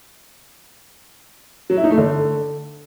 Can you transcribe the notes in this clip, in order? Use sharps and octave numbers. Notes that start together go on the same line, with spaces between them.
F#3
E4
D#4
A3
D3